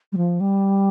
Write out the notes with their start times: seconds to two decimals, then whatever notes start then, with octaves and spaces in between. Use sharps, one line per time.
0.12 G3
0.17 F3
0.40 G3